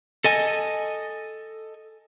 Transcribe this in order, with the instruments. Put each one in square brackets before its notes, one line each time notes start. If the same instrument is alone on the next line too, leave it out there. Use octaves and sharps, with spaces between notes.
[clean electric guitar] A4 D#5 G#5